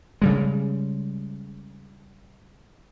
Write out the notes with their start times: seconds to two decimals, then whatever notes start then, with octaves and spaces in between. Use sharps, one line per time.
0.22 C#3 G3 G#3